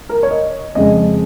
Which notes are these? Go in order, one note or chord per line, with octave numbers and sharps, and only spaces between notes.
A#4
C#5
D#5
F2 C#3 G#3 D#5